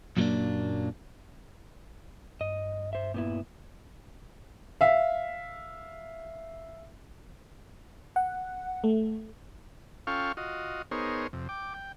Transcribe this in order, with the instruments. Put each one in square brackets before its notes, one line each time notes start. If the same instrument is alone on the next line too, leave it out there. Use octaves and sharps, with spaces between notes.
[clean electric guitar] F#2 A#2 F#3 G3 A#3 D4
[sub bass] G2 [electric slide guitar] D#5
[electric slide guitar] C5 E5
A#2 B3 E4
[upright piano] E5 F5
[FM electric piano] F#5
A3
[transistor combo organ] C#4 F4 A4 F5 G5 C#6
F4 F#4 D#5
B3 D#4 G#4 A#4 C5 C#5
F2 C3
G5 D6
G5